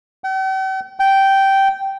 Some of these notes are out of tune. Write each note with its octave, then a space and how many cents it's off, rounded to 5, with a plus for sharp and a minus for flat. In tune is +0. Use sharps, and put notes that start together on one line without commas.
G5 -45
G5 -10